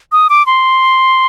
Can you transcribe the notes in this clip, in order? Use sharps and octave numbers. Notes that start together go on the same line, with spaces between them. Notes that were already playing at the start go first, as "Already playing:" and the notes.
D#6
D6
C6